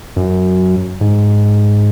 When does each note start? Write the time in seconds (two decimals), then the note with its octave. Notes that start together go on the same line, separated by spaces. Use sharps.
0.16 F#2
1.01 G#2